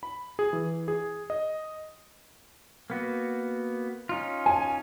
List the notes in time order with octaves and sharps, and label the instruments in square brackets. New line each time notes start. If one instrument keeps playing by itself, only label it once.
[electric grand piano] B5
G#4
E3
G#4
D#5
[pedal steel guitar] A#3 B3 F#4
C#4 D#4 F4
[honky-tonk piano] G#5